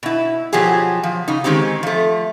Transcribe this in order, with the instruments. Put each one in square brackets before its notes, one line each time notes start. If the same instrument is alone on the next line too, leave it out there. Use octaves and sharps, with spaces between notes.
[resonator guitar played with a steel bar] B2 E4
B2 F3 F#3 G4 G#4
F3
C#3 D#4
D#3 G#3 C4 C#4 G4
F3 A3